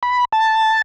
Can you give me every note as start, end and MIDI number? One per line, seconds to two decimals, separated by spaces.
0.03 0.25 83
0.33 0.82 81